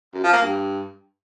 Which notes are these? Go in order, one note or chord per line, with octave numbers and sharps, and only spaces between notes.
F#2
F3
A#3
G2